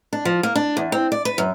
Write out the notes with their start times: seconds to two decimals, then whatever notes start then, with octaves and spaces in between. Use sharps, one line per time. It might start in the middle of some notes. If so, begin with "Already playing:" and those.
0.13 D4
0.25 F3
0.43 A#3
0.56 D4
0.77 E2
0.92 C4
1.12 D5
1.25 B4
1.38 F#2